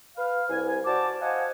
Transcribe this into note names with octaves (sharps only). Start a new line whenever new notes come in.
B4 F5
C2 G#5
F#4 C5 D5 A5 D6
C5 D#5 F5 F#5 G#5 A5